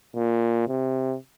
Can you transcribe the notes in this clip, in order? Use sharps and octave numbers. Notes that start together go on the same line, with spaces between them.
A#2
C3